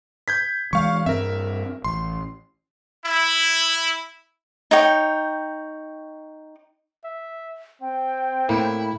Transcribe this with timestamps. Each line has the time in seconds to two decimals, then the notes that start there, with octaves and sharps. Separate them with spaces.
0.28 G6 G#6 B6
0.73 E3 G#3 F5 C#6
1.06 G2 C4 A#4 E5
1.84 A1 C6
3.06 E4
4.71 D#4 C#5 G5
7.04 E5
7.81 C4 G5
8.49 A2 A#3 E4